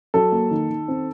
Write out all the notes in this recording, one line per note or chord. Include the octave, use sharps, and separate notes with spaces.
F#3 A4
A#3
D#3
D#3
C4